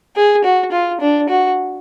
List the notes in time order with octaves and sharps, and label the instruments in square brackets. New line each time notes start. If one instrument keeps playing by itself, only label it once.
[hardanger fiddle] G#4
F#4
F4
D4
F#4